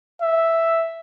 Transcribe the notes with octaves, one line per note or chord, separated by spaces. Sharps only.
E5